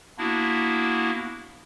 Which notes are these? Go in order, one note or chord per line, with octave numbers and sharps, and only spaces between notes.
A#3 B3 D4 E4 F#4